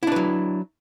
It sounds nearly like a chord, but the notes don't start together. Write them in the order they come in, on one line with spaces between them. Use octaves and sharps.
E4 D4 B4 F#3